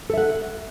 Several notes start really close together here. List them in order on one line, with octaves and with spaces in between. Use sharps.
A4 E5 F#5